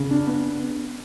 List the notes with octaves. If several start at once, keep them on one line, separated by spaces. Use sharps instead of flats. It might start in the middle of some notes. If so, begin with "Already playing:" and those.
Already playing: C#3
D4
B3